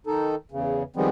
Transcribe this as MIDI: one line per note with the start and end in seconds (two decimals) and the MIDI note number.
0.07 0.35 51
0.07 0.35 63
0.07 0.35 69
0.51 0.83 40
0.51 0.83 49
0.96 1.09 51
0.96 1.09 53
0.96 1.09 55
0.96 1.09 56
0.96 1.09 59
0.96 1.09 60